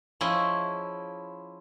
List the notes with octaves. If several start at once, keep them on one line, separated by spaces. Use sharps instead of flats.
F3 C#4 E4 G#4 D#5